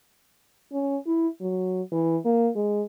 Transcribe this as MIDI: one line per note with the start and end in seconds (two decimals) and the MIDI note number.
0.72 0.97 61
1.06 1.27 64
1.41 1.82 54
1.92 2.17 52
2.25 2.50 58
2.55 2.83 56